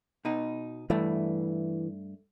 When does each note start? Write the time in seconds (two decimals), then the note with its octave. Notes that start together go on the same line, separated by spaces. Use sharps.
0.25 B2 D#4
0.90 G2 E3 A3